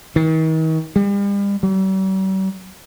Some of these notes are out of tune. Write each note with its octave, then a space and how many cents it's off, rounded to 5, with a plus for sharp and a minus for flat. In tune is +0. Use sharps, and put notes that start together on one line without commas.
D#3 +45
G3 +40
G3 -45